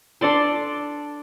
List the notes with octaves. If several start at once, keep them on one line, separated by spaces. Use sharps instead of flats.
D4 A4 D5 C6